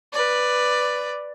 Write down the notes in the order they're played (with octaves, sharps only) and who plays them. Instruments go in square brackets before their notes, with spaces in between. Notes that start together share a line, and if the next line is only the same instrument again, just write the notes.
[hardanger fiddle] B4 D5